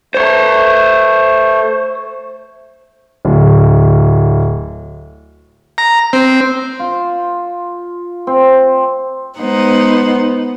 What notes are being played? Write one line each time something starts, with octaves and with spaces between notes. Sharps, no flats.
A3 C5 C#5
D1
A#5
C4
F4
C4
G#3 B3 D#4 C5 F#5